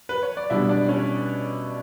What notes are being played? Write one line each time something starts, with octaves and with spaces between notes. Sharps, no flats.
B4
C#5
D5
B2 G3 B3 D4 E4 E5
D4 D5
C#4 C#5